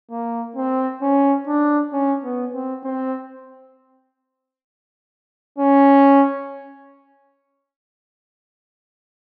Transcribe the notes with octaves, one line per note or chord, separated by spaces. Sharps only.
A#3
C4
C#4
D4
C#4
B3
C4
C4
C#4